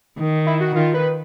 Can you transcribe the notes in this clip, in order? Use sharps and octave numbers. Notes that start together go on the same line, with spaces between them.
D#3
E4
F#4
D#3 F4
B4